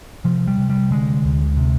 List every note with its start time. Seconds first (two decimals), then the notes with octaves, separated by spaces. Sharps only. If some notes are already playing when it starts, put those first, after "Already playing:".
0.24 C3 F3
0.47 G3
0.58 C3
0.70 G3
0.91 D3 G#3
1.24 D2
1.57 C3